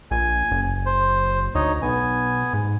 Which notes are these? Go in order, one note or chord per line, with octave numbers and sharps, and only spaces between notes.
A#1 G#5
F#1
C5
D2 D#4 C#5 D#5
B1 B3 G#5
G#2